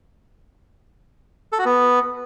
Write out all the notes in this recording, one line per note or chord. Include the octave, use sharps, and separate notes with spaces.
A4
F#4
B3